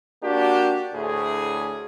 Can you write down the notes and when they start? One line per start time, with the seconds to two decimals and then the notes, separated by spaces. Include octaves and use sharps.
0.24 A#3 D4 F#4 G4
0.94 D2 A2 G#4